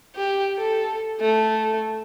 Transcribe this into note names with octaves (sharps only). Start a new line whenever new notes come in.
G4
A4
A3